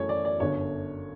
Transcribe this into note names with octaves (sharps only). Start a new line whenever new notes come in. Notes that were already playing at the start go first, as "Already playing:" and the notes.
Already playing: F#2 E3 A3 C#5
D5
D5
G1 F#2 D3 C#5